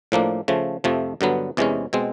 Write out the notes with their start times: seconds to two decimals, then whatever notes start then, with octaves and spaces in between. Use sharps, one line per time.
0.12 A2 F3 A#3 D4
0.48 C#3 F3 A3
0.84 F2 C3 F3 A3
1.21 G2 D3 F#3 B3
1.57 E2 C3 E3 G#3 C#4
1.93 B2 G#3 C4